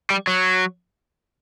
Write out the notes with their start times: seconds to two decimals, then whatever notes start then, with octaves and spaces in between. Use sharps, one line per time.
0.10 G3
0.27 F#3